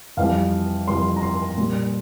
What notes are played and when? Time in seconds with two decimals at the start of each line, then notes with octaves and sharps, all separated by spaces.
0.17 F2 E3 G3 F5
0.88 F2 E3 G3 C6
1.16 A#5
1.23 C6
1.57 A#2 G3